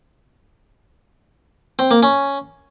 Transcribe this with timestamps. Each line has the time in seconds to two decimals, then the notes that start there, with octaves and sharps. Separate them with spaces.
1.79 C4
1.91 A#3
2.03 C#4